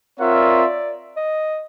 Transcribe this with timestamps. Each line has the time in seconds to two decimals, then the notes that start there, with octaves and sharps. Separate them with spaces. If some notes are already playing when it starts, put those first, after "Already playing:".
0.19 C4 F4 A#4 C#5 E5 F#5
0.35 D5
1.16 D#5